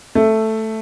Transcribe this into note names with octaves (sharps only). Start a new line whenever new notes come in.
A3